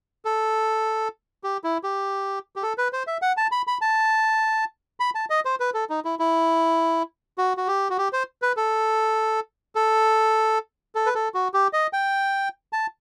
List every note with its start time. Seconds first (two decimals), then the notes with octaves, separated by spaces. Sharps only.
0.25 A4
1.44 G4
1.64 E4
1.83 G4
2.56 G4
2.63 A4
2.78 B4
2.93 C5
3.07 E5
3.22 F#5
3.37 A5
3.52 B5
3.67 B5
3.81 A5
5.00 B5
5.15 A5
5.30 D#5
5.45 C5
5.60 B4
5.74 A4
5.90 D#4
6.05 E4
6.19 E4
7.38 F#4
7.57 F#4
7.67 G4
7.90 F#4
7.98 G4
8.13 C5
8.42 B4
8.57 A4
9.75 A4
10.95 A4
11.06 B4
11.15 A4
11.34 F#4
11.54 G4
11.73 D#5
11.93 G5
12.73 A5